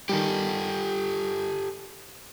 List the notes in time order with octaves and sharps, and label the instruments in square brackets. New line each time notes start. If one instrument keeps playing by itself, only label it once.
[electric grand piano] D#3 G3 [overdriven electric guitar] G4 A4